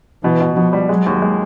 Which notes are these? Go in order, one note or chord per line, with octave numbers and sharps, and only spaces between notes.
B2 E3
B2
B2 F3
G3
F#3 G#3
D#2
G#3